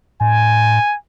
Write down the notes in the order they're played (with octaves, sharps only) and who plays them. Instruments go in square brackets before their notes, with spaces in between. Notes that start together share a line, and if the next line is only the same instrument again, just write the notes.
[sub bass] A2 [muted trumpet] G#5